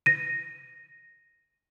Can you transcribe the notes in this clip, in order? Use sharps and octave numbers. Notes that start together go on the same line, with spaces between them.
A#6 D#7